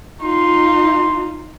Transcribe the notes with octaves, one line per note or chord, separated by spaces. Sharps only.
D#4 F4 C6